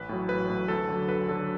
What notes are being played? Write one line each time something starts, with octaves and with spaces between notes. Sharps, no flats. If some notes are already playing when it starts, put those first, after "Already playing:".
Already playing: A1 B4
A2 F#3
A1 B4
A2 F#3
D2 A4
D3
F#3
D2 B4
D3 F#3 A4